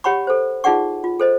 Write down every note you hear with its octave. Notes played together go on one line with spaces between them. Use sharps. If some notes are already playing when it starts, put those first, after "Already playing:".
G4 C#5 F#5 B5 C#6
A4 C5
D#4 F4 G#4 D5 F#5 C#6
F4
A4 C5 D#5